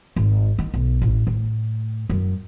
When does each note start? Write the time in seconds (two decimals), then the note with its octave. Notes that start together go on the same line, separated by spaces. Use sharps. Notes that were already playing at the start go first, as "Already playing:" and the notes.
0.16 G#1
0.59 D#3
0.74 B1
1.02 A1
1.27 A2
2.09 F#2